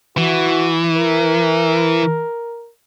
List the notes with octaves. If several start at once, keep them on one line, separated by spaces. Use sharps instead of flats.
E3 F#4
A#4